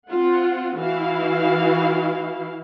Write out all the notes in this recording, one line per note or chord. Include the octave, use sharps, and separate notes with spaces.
C4 F4 F#5
E3 E4 F#4 F5